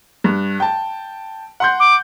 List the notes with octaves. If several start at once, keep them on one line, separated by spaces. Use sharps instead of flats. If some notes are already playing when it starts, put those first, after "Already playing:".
G2
G5 A5
F#5 C6 G6
D6